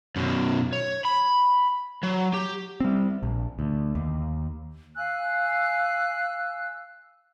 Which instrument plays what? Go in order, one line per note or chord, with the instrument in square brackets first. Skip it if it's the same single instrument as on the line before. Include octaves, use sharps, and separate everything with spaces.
[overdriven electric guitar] F#2 B2
C#5
B5
F#3
G4
[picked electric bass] G3 C4
A#1
D2
D#2
[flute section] F5 G#5 E6 F#6